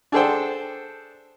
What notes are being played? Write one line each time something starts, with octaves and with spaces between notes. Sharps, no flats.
D4 G#4 A4 C5 G5